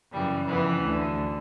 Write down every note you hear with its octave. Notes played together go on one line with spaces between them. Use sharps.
F#2 C#3 E3 G3
F2 C#3 E3 B3
D2 D3